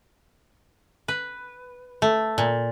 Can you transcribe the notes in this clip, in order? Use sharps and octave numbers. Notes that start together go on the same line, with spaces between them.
B4
A3
A#2